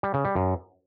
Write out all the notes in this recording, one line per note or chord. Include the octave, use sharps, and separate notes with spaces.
G3
C#3
G3
F#2